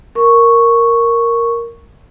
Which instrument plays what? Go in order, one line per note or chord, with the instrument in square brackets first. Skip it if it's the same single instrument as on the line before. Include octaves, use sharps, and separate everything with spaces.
[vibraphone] A#4 C#6